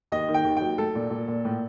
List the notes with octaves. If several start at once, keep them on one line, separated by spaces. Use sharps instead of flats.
D#2 D#5
D#3
G5
D#2
F#3 G5
A3 A4
A#2
A#2
A#2
A2